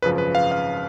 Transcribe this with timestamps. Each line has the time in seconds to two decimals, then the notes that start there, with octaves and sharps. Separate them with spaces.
0.02 G#1 F#2 C#3 F3 B4
0.18 B4
0.35 F5
0.52 F5